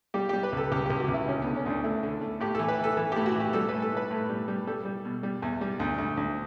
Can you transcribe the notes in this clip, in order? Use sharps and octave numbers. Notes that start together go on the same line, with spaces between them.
G3 G4
G3 G4
B4
C#2 A4
C#2 G4
C#2 G4
F#4
C#2
E4
D2 C#4
D3 B3
C#4
D2 D4
A3 E4
D3
A3
A2 G4
E3 A4
B4
E3 A4
E3 A4
A2 G4
F#4
E3
G4
G3 A4
A2 B4
A4
A2 B4
A2
G3
G3
G3 A4
G3
B2
G3
E2
G3
D2
D2
D2